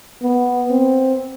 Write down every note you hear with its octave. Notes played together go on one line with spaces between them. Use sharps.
B3
C4